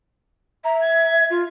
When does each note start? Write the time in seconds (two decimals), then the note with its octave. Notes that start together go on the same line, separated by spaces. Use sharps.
0.64 E5 A#5
0.80 G#6
1.30 F4